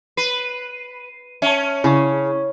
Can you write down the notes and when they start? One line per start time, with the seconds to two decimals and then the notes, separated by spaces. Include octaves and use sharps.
0.17 B4 C7 D#7
1.42 C#4 E5 A5
1.84 C#3 E4 C#6